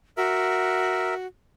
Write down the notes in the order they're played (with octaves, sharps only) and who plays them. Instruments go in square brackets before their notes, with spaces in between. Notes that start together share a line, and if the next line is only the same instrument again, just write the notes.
[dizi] F#4 [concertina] A#4 E5